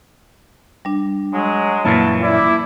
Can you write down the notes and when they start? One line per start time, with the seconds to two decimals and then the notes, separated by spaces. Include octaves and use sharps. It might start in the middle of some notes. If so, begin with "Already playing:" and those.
0.85 G3 D4
1.33 F#3 G#3
1.85 F#2 A#2 E3 E4 F#4 A5
2.22 E4 D5 D6